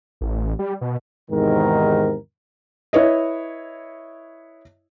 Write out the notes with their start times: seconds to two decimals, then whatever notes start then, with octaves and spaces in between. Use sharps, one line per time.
0.21 A1
0.59 G3
0.81 B2
1.31 E2 G#2 C3 D#3 A#4
2.93 E4 B4 C#5 D#5